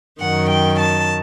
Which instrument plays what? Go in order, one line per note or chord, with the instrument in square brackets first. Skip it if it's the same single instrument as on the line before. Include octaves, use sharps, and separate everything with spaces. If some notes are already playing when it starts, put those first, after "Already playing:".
[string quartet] F#2 D#3 F#5
G5
A5